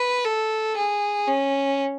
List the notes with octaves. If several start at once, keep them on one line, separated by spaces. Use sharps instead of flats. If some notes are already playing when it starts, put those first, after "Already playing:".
Already playing: B4
A4
G#4
C#4